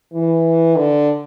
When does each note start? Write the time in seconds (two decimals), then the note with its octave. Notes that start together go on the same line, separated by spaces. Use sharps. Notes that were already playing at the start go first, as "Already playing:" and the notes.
0.13 E3
0.76 D3